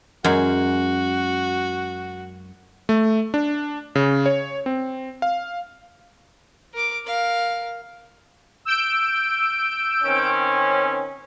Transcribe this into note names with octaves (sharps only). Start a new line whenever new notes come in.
F#2 G#3 F#4
A3
D4
C#3
C#5
C4
F5
A#4 D6
A#4 F5
E6 G6 D7
D#3 C4 C#4